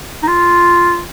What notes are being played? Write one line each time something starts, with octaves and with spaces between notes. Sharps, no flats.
D#4
F4